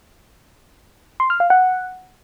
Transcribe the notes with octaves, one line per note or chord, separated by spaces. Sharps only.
C6
F6
F5
F#5